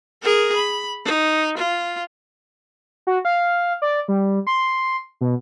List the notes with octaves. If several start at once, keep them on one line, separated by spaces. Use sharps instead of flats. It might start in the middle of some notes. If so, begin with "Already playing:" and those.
G#4 A#4
B5
D#4
F4
F#4
F5
D5
G3
C6
B2